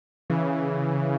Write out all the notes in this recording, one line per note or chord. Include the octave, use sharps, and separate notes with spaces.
C#3 E3